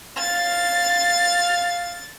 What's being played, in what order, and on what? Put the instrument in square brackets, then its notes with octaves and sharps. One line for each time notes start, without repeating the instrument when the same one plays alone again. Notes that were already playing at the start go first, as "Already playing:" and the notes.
[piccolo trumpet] F5 [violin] A6